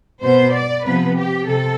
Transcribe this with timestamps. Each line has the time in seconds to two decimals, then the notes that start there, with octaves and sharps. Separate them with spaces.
0.22 B2 B3 C5
0.54 D5
0.85 C3 F3 B3 B4
1.16 G4
1.46 C3 A4